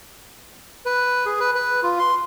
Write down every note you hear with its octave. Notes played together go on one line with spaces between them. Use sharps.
B4
G#4
B4
B4
F4
C6